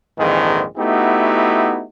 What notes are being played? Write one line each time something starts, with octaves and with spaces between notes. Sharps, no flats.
A#1 F2 G#2 D#3 E3 G#3
A3 B3 D#4 E4 F#4 G4